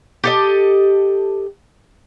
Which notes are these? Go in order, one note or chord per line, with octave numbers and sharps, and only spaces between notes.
G4 A4 D#5